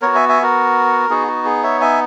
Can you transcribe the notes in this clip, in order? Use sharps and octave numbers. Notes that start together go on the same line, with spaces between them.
B3 F#4 A#4 C#5
E5 G#5
E5 G#5
F#4 A#4
B3 D#4 F#4 G#4
F#4
G#4
C#5 E5
E5 G#5